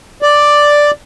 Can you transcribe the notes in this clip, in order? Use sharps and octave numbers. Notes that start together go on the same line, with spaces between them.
D5